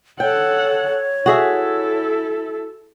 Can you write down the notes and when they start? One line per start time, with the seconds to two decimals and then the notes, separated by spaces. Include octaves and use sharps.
0.20 A4 C#5 F#5 G5
1.26 E4 F#4 G#4 A4 E5